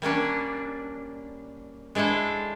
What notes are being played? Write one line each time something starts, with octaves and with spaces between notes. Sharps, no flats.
G3 A#3 C#4 D4
G#3 D4 E4 A4 C5